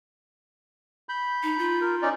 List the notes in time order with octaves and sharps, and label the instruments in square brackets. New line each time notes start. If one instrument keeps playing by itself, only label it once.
[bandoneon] B5 G6
[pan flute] D#4
F4
[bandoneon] A#4
C#4 D#4 D5